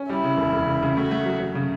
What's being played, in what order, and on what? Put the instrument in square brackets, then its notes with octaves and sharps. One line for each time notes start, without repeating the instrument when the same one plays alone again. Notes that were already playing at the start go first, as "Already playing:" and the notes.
Already playing: [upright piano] C#4
[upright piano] G3 [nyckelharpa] E4
[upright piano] C#3
E1
E1
C#3
C#3
[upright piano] A3 [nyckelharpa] F#4
[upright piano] A3
F#3
F#3
C#3